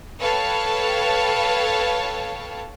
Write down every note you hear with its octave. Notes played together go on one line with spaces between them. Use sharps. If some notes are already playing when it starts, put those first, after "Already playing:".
A4 B4 C#5 F5 G5 A5